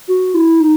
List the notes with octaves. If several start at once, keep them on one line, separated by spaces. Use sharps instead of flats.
F#4
E4
D#4